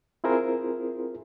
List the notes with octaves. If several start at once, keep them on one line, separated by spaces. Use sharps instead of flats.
C4 E4 F4 G#4 A#4 C5